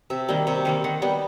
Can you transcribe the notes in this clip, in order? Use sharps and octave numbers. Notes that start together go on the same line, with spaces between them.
C3 E5
D#3 G3 A#3
C3
D#3 G3 A#3
D#3 F#5
G3 B3